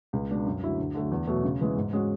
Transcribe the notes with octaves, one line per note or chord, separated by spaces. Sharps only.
C#2
B2 G#3 D4
F#2
D3 F#3 A3 E4
D2
D3 F#3 A3
E2
B2 F#3 A3
C#3
E3 G#3 B3
G#2
G#3 C#4 F#4